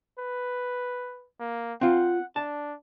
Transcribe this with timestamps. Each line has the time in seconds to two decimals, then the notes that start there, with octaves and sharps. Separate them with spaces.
0.19 B4
1.40 A#3
1.81 C4 F4 F#5
2.36 D4 A5